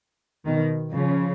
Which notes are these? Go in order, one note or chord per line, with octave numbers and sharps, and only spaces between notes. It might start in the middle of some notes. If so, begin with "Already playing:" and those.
B2 D#3
C#3 F3